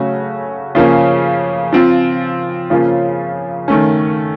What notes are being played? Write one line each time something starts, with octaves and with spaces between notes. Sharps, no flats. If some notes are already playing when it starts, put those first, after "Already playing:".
Already playing: C#3 F#3 A3 C#4 F#4
C#3 F3 A#3 C#4
F3 C4 F4
C#3 F3 A#3 C#4 F4
D#3 A3 C#4